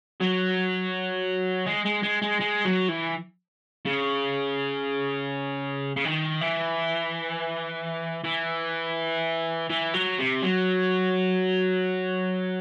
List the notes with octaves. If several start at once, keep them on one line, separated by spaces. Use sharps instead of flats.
F#3
G#3
G#3
G#3
G#3
G#3
F#3
E3
C#3
C#3
D#3
E3
E3
E3
F#3
C3
F#3